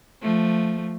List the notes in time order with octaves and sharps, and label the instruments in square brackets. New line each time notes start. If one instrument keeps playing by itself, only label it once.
[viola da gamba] F3 A3